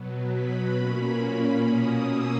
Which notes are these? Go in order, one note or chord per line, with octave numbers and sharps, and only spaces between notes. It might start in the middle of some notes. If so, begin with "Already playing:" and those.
Already playing: B2 F#3 B3
B5
A#2 A#3 C#4
B2 A#3 C#4 D#6
E6